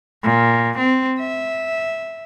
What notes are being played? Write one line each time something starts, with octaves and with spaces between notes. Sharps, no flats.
A#2
C4
E5